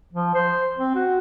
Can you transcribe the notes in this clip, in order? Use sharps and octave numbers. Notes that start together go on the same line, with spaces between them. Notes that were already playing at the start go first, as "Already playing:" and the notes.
F3
C5
C4
F#4